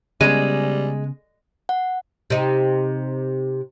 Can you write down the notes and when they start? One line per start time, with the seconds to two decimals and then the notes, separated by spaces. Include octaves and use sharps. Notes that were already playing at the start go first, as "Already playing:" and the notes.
0.21 C#3 G3 G#3 B3 C#4 D#7
1.69 F#5
2.30 C3 D#4